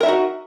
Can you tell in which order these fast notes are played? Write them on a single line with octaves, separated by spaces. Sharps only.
A#4 E5 D#4 F#4